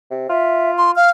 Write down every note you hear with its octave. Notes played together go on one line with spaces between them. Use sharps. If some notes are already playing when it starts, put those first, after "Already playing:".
C3
F4 E5
C6
F5 F6